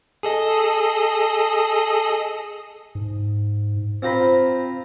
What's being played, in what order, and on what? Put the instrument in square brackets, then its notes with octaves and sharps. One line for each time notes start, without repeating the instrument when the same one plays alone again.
[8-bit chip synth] G#4 A4 D#5
[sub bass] G#2
[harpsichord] C4 F4 C5 A#5 B5